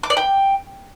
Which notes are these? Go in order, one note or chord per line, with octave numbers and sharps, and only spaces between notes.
D6
D5
G5